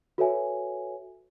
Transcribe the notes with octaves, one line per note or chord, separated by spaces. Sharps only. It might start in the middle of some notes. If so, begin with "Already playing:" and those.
F#4 A4 B4 C#5 E5 G#5